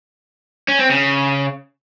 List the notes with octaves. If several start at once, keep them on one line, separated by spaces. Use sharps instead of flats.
C#4
C4
C#3